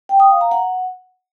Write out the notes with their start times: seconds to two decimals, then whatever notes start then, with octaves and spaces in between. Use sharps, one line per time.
0.09 G5
0.20 D#6
0.30 F5
0.41 A#5
0.51 F#5